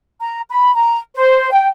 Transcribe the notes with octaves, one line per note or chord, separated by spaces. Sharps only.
A#5
B5
A#5
C5
G5